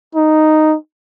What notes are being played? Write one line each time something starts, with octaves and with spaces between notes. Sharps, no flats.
D#4